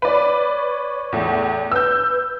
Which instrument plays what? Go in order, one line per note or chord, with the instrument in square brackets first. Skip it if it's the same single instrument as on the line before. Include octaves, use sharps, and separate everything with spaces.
[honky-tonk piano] B4 D5 [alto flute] C#5
[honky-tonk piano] E2 A2
[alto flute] B4 [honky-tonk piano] E6 G6